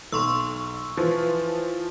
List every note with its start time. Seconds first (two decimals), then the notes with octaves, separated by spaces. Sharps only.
0.12 B1 C6 C#6 E6
0.97 E3 F3